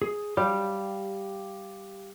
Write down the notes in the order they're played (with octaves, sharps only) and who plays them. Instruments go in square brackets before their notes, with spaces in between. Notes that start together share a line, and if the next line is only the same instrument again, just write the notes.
[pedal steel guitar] G#4
[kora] G3 [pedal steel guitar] G4 F5 G6